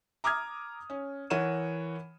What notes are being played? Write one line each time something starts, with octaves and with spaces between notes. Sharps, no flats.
A#5 D6 D#6 F6 G#6
C#4
E3 A#4 C#5 F#5 D#7 E7